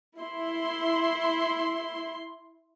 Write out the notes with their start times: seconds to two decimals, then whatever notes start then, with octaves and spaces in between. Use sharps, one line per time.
0.18 E4 C6